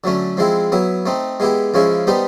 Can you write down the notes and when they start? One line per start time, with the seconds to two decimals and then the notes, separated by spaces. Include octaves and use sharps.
0.04 D3 F#3 A3 C#4
0.37 F3 G#3 C4 E4
0.72 F#3 B3 E4
1.06 A3 C4 D#4
1.40 G#3 B3 E4 G4
1.74 C#3 F3 G#3 C#4 E4
2.07 G3 B3 D#4 G4 C5